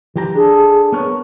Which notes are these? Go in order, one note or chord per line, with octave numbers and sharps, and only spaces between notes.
E3 G4 A#5
D4 G#4 A4
B3 A#4 C#5